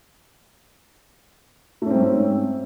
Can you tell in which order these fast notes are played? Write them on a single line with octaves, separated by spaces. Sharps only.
A3 C#4 C4 G#2